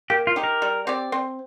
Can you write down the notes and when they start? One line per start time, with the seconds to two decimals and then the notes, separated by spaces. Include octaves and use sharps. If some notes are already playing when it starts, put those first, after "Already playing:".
0.10 A#3 G4
0.27 F4
0.36 D#4 G4
0.44 A#4
0.62 G3
0.87 C4 G4 D5
1.12 C4